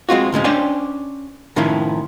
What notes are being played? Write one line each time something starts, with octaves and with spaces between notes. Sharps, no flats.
G#3 C4 F4 F#4
D2 A2 G#3 C#4
C#4 D4 C5 D5 G5 G#5
A2 D#3 F3 C#4 E4